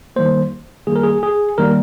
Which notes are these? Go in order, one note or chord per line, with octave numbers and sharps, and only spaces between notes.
D#3 G3 A#3 C5
D#3 G3 A#3 G#4
A#4
G#4
G#4
D#3 G3 A#3 A#4